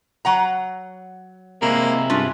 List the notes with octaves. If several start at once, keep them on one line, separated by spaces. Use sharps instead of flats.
F#3 F#5 A#5
C3 G#3 A#3 E4
G2 C#4 D4 F4